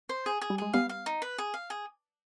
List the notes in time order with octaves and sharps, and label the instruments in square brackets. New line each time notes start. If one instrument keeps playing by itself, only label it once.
[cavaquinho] C5
G#4
G#4
[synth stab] G3
[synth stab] G#3 [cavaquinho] G#4
[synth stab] G3 B3 [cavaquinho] F5
[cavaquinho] F5
D#4
B4
G#4
F5
G#4